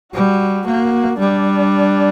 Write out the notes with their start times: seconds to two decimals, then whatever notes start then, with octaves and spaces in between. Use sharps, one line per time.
0.13 G3 F#4
0.66 A#3 F#4
1.19 G3 D4